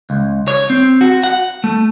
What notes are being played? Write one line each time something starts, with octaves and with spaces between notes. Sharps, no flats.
C#2
C#5
C4
F#4
F#5
A3